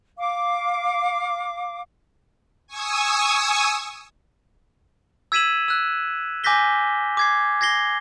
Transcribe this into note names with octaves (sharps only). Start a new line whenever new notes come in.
F5 D6
G#5 C#6 D#6 E6
E6 G#6 B6 D#7 E7 F#7
E6 F#6
G#5 D6 G6 A#6 B6 G7
D6 G#6 C7
G#6 A#6 C7 G7